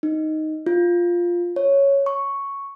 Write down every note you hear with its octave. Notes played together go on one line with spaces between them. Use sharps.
D#4
F4
C#5
C#6